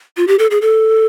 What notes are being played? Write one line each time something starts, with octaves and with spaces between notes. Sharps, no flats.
F4
G4
A4
G#4
A4